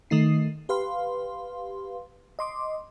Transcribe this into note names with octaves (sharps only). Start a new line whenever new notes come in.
D#3 A3 D#4 C7
G4 B4 F5 C6
D#5 C6 D6